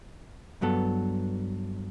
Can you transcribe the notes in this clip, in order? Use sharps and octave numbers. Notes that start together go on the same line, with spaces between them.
G2 F#3 B3 A4